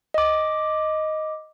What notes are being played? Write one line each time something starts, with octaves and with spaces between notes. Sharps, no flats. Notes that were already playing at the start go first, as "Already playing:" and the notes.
D#5 D6